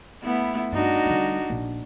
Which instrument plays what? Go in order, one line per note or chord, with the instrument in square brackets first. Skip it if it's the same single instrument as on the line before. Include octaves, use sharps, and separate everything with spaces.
[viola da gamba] A3 B3 E4
[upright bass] G2 [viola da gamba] D4 D#4 F#4
[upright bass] D3 G3
A#1